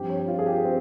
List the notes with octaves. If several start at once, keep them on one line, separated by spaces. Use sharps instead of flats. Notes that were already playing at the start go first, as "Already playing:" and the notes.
Already playing: G2 F3 C4 G4
C#5
F4
G#4
G4
C4